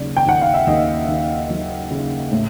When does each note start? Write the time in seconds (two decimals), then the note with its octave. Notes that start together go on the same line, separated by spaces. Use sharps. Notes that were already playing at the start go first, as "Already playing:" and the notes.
Already playing: D#2 C#3 F#3 D5
0.17 G5
0.26 D#2 F#5
0.41 F5
0.54 E5
0.67 D#2 D#5
1.08 D#2
1.50 F#3
1.91 C#3
2.32 A2